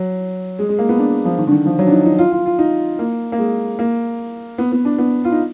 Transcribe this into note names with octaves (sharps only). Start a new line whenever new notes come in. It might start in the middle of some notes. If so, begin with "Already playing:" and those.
Already playing: F#3
G#3
G#3
A#3
B3
D4
F3
D#3
D3
D#3
F3
F#3
D4
D#4
D#4
F4
F4
F4
D#4
A#3
A#3
G#3
A#3
B3
B3
D4
B3
F4
D#4